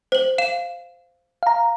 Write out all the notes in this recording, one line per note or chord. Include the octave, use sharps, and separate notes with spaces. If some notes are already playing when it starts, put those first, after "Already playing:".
C5 F#7
F5 E7
F5 A#5